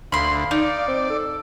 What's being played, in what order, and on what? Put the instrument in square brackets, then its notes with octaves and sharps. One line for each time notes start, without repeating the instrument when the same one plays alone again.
[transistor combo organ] D2 [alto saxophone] F5 [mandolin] B5 C6
[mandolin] D#4 [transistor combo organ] D5
[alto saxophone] C4
A4